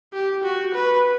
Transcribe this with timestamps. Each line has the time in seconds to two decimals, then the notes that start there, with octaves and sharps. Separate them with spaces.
0.13 G4
0.44 F#4
0.74 B4